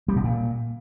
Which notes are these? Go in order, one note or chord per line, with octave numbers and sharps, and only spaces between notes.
G3
B2
A#2